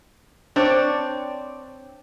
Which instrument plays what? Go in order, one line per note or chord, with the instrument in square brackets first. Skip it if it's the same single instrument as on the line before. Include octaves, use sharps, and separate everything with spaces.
[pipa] C4 [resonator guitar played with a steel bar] D4 C#5 D5